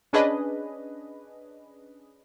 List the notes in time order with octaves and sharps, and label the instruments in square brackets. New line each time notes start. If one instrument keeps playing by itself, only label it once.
[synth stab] C#4 D4 G#4 B4 D#5